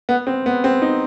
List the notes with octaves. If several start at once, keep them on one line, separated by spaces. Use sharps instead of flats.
B3
C4
B3
C4
D#4